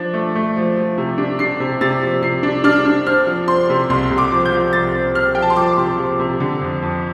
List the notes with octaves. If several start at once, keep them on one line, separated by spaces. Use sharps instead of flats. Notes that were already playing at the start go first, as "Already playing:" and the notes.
Already playing: F3 D4 A6
A3
A3
F3
F3
C3
D4
D4 C7
C3
C3 A6
F3
C3 C7
D4
D4 F6
D4
C4 F6
F3
C4 C6
C3
C2 C6
C2
D6
F3
G6
F3
C2 A6
C4
C4 F6
F3 G5
A5
C6
F3 D6
C3
F3
C3
D3
F2
F2